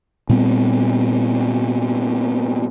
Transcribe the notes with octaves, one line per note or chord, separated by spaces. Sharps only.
A#2 G3 B3 C4